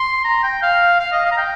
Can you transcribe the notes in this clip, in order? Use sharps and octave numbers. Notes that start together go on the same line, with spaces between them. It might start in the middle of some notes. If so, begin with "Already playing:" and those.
Already playing: C6
A#5
G5
F5
F5
D#5
F5
A#5
G5